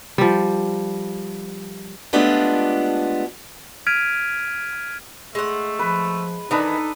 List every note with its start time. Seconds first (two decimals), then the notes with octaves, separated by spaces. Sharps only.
0.18 F3 G3
2.13 G#3 A3 B3 D4 F4 G4
3.87 F6 G#6 B6 D7 D#7 F7
5.35 G#3 A3 F#5
5.79 F3 B4
6.51 D#3 E3 D4 D#4 A4 B4 D#6